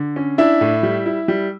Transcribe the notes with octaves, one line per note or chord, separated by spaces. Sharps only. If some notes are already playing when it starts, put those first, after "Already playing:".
Already playing: D3
C#4
D4 E4 E5
A2
G3
E4
G3